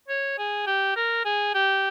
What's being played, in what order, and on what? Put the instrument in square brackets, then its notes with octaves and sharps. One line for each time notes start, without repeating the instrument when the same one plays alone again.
[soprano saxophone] C#5
G#4
G4
A#4
G#4
G4